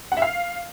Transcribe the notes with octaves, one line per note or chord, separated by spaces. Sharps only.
F#5
E5
F5